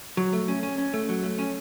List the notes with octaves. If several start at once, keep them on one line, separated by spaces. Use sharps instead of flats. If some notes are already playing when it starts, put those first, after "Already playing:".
F#3
A3
C#4
C#4
C#4
A3
F#3
A3
C#4